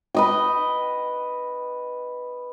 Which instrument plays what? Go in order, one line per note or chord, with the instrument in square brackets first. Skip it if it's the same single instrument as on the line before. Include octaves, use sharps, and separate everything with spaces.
[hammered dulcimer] B4 D#5 G5